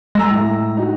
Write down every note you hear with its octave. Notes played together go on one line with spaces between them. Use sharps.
G#3 A#5 E6 A#6
A2
D#4 F#4